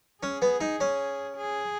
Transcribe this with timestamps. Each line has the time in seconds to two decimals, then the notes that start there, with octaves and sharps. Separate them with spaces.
0.23 C#4 G#4
0.42 B3
0.61 D#4
0.80 C#4
1.37 G#4